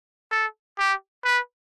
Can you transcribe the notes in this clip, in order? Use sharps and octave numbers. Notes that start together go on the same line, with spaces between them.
A4
G4
B4